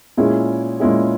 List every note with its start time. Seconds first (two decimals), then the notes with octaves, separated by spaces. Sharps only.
0.17 A#2 G#3 C#4 E4 G#4
0.80 A#2 G#3 C#4 E4 G#4